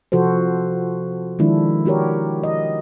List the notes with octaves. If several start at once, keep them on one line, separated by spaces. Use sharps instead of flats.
C3 F3 F#4 A4 C5
D#3 F3 G#3 D4 E4
D4 F#4 G4 A#4 C#5
D#5